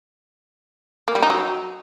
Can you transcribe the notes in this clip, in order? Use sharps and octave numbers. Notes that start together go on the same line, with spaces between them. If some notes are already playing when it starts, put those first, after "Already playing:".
A#3
G3
D#4
F#3